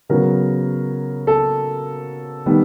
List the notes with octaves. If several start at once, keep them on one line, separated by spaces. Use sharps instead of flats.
C#3 F#3 B3 A#4
A4
D#3 G3 B3